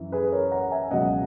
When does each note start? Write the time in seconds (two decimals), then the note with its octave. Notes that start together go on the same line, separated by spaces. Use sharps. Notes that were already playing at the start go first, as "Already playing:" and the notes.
Already playing: F#2 E3
0.12 G#4 B4
0.32 A#4 C#5
0.52 F#5 A#5
0.71 E5 G#5
0.91 C#2 B2 F#3 D#5 F#5